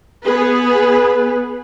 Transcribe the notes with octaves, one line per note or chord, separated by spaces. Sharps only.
B3 G#4 B4